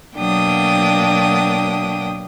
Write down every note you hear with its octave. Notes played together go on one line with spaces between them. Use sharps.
B2 F#3 A#3 D4 G5 D#6